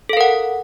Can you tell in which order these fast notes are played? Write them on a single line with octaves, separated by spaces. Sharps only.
A4 F5 A#4 F#5